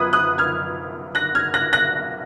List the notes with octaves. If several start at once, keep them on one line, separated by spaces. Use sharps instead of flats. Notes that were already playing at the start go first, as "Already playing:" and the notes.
Already playing: F#2 F3 B3 B5 D#6 F#6 G#6
D#6 F#6
F6 G#6
F#6 A#6
F6 G#6
F#6 A#6
F#6 A#6